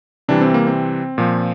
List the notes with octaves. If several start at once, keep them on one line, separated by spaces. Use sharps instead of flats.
C3 E3 G3 D4
C4
A#3
C4
A#2 F3